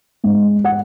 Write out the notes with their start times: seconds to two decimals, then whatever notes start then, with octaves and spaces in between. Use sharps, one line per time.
0.24 G#2
0.64 F#5